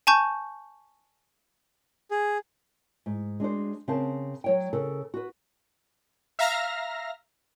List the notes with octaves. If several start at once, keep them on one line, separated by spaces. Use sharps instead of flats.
G#5 A5 C#6 G6
G#4
G#2
G#3 D4 F#4 C5
C#3 C4 A#4 C5 F5 A5
F#3 C#5 G5
C#3 A4 A#4
F#4 B4
E5 F5 A#5 F6 A#6